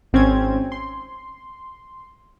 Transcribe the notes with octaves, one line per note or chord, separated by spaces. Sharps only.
G#1 C4 C#4 G#6
C6